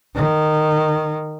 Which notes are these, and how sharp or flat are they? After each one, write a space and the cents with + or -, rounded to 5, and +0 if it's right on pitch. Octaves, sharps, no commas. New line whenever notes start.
D#3 -15